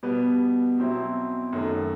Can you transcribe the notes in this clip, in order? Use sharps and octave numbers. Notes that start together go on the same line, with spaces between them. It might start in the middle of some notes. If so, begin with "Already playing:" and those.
B2 G3 B3
B2 F#3 C4 E4
F#2 D#3 A3